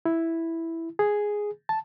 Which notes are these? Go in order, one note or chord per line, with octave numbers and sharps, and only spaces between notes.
E4
G#4
A5